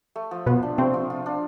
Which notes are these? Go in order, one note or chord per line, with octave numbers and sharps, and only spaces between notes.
A3
F3
B2 B3 F4
D4
C3 A3 C4
F3
F4
D4